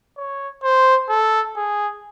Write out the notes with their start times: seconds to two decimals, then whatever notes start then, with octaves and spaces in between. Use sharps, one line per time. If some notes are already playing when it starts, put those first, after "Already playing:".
0.17 C#5
0.63 C5
1.09 A4
1.56 G#4